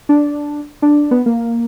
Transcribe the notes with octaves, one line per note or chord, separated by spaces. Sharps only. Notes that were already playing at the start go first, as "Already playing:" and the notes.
D4
D4
B3
A#3